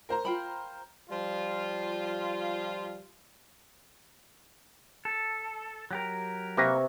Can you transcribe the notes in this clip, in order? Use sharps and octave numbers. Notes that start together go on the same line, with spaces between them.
A#4 C5 A#5
F4 G5 B5
F3 G3 F4
A4
F#3 G4 A#4
C3 A#3 B4 A#5 C#6